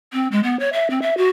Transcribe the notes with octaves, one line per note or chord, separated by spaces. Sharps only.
C4
G#3
B3
C#5
E5
C4
E5
F#4